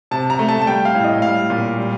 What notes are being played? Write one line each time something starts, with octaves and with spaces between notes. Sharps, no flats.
C3 A5
A#5
A3
A5
A5
G3 G5
F5
A2
D#5
G3 F5
A#2
G3